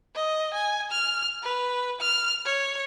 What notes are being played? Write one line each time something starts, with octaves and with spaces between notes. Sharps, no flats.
D#5
G#5
F6
B4
F6
C#5